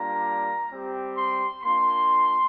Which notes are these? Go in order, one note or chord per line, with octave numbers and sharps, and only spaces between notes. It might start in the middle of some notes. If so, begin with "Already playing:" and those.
Already playing: G3 A#3 D4 F4 A#5
G3 C4 G4
C6
A#3 D4 F4 C6